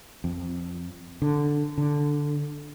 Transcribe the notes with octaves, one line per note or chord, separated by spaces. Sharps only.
F2
D3
D3